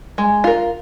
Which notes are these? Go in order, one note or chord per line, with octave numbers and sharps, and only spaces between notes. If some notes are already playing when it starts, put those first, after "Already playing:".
G#3
F4 A#4